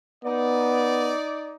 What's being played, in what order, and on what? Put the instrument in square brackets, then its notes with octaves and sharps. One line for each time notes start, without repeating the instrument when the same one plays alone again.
[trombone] B3 [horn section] D#4 D5